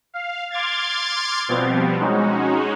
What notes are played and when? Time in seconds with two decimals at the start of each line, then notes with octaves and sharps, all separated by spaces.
0.14 F5
0.51 C6 D6 F6 G#6 A6
1.48 B2 F3 G3 B3 C4
2.00 G#3 C#4 D#4 F#4